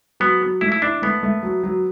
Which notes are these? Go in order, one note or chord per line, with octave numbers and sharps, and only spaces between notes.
F#3 B3
F#3
A3 E4
E4
D4 E4
A3 B3
A3
F#3
F#3